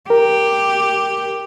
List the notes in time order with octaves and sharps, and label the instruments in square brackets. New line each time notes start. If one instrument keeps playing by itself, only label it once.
[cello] G4 [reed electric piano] A#4